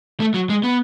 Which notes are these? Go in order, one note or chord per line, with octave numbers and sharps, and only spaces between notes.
A3
F#3
G#3
B3